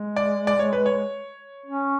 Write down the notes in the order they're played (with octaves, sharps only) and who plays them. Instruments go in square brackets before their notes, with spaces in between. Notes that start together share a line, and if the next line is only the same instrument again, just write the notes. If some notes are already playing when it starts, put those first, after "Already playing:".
Already playing: [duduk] G#3
[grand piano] D5
D5
C#5
B4
C#5
[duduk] C#4